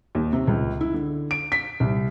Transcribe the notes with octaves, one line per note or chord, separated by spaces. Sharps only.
D#2
C3
C#2
E4
D3
D7
B6
C2